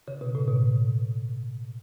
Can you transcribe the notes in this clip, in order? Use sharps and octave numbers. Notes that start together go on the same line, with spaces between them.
C#3
B2
A2
B2